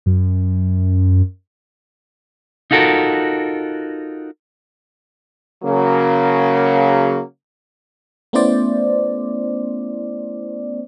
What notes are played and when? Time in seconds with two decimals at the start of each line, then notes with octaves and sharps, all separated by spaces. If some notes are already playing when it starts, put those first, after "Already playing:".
0.06 F#2
2.71 D#4 F4 F#4 A4 A#4
5.63 C#3 F#3 A#3
8.33 A3 B3 C#4 E4 C5 D5